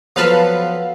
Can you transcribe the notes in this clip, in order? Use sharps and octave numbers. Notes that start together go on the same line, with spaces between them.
F3 F#3 B3 A4 B4 F5